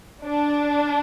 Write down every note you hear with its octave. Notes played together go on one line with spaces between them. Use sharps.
D4